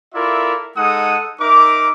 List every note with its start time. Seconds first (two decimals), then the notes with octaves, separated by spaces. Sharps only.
0.14 E4 F4 A4 A#4 D5 E5
0.77 G#3 D#4 A4 F#5 D#6
1.39 D#4 A#4 E5 D6